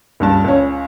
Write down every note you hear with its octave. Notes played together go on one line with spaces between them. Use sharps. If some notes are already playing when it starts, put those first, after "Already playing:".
C#2 G2 A5
C#2 C#4